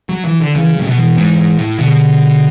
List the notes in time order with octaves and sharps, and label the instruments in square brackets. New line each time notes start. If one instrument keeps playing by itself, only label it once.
[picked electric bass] F#3
E3
D3
[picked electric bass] C#3 [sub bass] E3
[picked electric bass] A2 [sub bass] F#3
[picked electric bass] B2
[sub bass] E3
[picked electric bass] G#2
G#2
A2
[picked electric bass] B2 [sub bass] D3